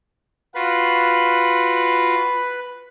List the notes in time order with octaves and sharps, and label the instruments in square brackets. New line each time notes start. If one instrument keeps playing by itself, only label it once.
[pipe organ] F4 F#4 [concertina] B4 B5